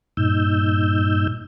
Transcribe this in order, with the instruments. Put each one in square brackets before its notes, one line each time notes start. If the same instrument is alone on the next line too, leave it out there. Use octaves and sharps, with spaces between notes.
[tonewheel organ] G2 A#2 D#4 E6 G6